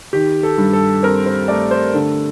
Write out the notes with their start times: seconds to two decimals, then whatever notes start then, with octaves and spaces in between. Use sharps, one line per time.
0.13 D#3 G4
0.43 A4
0.58 G2
0.73 A4
1.03 C4 A#4
1.26 C5
1.48 A3 D5
1.71 C5
1.94 D3 A4